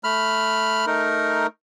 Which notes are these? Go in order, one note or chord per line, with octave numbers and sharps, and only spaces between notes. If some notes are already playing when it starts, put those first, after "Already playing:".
A3 B5 F6
A3 D#4 A#4